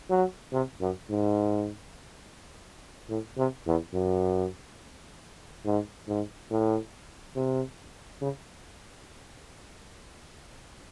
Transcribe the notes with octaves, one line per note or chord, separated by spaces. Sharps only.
F#3
C3
F#2
G#2
A2
C3
E2
F#2
G#2
G#2
A2
C3
C#3